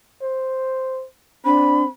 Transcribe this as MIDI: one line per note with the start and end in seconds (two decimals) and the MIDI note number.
0.22 1.05 72
1.45 1.88 60
1.45 1.84 62
1.45 1.84 83